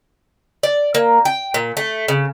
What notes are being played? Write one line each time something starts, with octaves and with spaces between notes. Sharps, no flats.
D5
A#3
G5
A#2
A3
C#3